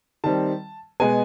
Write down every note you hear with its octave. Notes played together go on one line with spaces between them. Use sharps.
D#3 G3 C4 A5
B2 G#3 B3 G#5